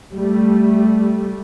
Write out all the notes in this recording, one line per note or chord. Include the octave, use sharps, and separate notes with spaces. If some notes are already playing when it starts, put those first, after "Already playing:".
G3 A3